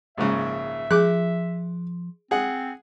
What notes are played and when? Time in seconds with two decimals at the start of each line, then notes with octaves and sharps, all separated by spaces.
0.18 A#1 G#2 C#3 E5
0.91 F3 G#4 D6 F#6
2.31 C4 G#4 F#5